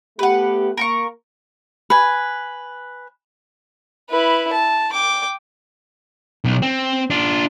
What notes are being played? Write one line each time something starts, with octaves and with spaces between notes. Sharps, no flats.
A3 B3 G4 B4 F#5
A#3 A#4 A#5 C#6
B4 G#5
E4 B4
A5
G5 D6
B1
C4
D4 F4